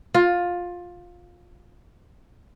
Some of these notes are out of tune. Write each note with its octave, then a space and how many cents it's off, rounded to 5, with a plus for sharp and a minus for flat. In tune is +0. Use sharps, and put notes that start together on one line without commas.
F4 +15